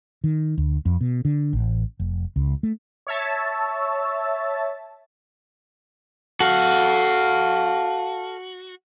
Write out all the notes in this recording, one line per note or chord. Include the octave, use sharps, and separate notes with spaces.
D#3
D2
F2
B2
D3
A1
F1
C#2
A3
C#5 E5 A5
F#4 A4 F5